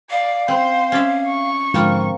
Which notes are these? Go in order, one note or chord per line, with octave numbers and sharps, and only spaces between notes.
D5 F5
C4 C5
C#4 D5 E5
C#6
G#2 D3 F3 A#3 C4 F4